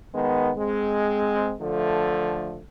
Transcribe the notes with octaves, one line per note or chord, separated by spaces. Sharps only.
D#3 G#3 B3
G#3 C4
D3 F3 A3